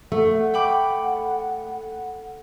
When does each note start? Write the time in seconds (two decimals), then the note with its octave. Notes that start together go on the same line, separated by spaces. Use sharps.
0.12 A3 F#5
0.54 G5 B5 D6